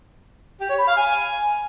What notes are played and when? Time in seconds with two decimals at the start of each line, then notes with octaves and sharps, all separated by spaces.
0.60 G4
0.69 C#5
0.78 B5
0.87 F5
0.97 G#5